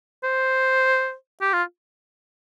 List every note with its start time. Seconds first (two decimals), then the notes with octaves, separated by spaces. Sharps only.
0.23 C5
1.41 G4
1.53 F4